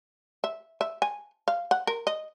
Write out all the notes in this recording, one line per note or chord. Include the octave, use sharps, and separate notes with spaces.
E5
E5
G#5
F5
F#5
A#4
D#5